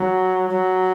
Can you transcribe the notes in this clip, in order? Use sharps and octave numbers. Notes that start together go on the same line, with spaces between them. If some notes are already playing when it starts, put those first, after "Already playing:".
Already playing: F#3
F#3